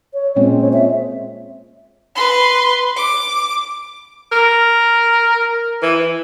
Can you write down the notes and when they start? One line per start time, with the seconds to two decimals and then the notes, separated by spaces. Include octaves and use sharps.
0.14 C#5
0.36 A#2 G#3 C4 C#4
0.61 C#5
0.73 E5
2.15 B4 C6
2.96 D6
4.32 A#4
5.82 E3